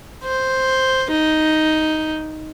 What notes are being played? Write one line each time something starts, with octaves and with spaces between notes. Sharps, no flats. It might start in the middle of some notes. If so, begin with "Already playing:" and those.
C5
D#4